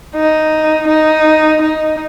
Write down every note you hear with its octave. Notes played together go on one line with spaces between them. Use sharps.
D#4
D#4
D#4